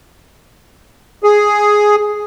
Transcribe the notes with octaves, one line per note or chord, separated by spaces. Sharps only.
G#4